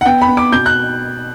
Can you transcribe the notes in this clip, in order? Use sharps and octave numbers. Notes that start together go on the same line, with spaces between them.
F#5
B3 G5
B5
B3
D6
B2 G6
F#6